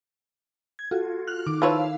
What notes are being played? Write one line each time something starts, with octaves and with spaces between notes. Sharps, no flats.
G#6
F4 F#4 A4
F6 F#6
D#3 D6
F3 E4 B4 C#5 F5 E6